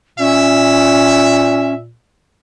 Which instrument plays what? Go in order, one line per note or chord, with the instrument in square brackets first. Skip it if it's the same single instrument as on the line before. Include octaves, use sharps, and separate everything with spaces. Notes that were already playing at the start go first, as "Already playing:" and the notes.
[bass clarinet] A#2 [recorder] C#4 [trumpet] E5